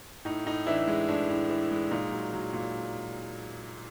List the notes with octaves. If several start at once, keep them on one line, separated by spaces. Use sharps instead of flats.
A2 D#4
A2 D#4
E3 D4 E4
G#3
A2 D4
A2
E3
G#3
A#2 D#4
F#3
F#3
A#2